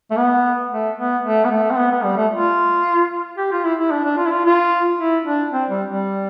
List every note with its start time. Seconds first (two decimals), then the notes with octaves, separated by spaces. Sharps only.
0.11 A3
0.17 B3
0.71 A3
0.98 B3
1.24 A3
1.44 B3
1.51 A3
1.71 C4
1.78 B3
1.91 B3
2.04 G3
2.17 A3
2.32 F4
3.38 G4
3.52 F4
3.64 E4
3.79 E4
3.91 D4
4.04 D4
4.18 F4
4.26 E4
4.31 F4
4.45 F4
4.99 E4
5.25 D4
5.53 C4
5.70 G3
5.88 G3